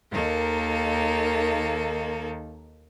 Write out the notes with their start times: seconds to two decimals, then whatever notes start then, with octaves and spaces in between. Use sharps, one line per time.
0.10 D#2 D#3 A#3 A4